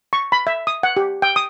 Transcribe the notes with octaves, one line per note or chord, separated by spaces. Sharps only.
C#6
B5
E5
D#6
F#5
G4
G5
D#6